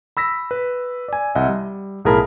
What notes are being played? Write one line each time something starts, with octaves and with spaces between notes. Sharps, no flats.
B5 E6 A#6 B6
B4
D5 G#5
C2 D#5 E5 F#5
G3
B1 A2 G#4 A#4 A5 B5